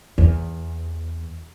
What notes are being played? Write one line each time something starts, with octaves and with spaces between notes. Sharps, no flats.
E2